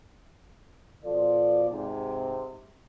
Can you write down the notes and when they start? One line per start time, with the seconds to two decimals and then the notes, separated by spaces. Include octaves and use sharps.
1.04 B2 F3 F4 A4 D5
1.70 G#2 C3